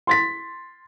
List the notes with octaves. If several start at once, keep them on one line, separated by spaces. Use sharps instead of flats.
C6 A6 B6